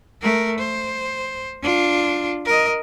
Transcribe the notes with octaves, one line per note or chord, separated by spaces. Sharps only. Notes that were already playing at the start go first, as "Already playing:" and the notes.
A3 A#4
C5
D4 F4
A#4 D#5